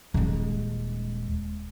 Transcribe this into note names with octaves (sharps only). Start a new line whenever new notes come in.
D#1 G#3